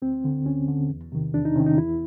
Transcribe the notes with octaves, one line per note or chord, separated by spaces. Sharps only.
D2 C4
D3
D2 C#4
D3
E2
C3 D#3
E2 D4
D#4
C3 D#3 C#4
D#4
E2 E4